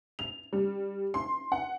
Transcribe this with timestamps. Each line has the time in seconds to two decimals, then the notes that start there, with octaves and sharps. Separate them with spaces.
0.19 F7
0.53 G3
1.14 C6
1.52 F#5